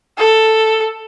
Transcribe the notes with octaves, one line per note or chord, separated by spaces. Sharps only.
A4